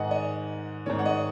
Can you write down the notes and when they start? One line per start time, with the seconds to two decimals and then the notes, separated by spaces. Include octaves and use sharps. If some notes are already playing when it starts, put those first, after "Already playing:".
Already playing: G#2 D#3 D#5 F#5 G#5
0.11 D#5
0.86 G#2 D#3 C#5
0.99 F#5
1.06 D#5